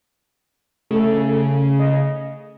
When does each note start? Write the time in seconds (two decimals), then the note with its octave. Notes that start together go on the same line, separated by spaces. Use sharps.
0.91 C#3 A3 A4
1.80 D#5